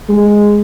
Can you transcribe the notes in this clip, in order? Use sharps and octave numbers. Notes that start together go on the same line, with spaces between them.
G#3